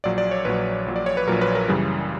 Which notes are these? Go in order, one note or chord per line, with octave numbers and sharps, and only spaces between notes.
A#1 A#2 F#3 D5
D5
C#5
A#1 A#2 F#3 B4
A#1 A#2 F#3
D5
C#5
B4
A#1 A#2 F#3 A#4
B4
A#4
F#2 C#3 E3 G3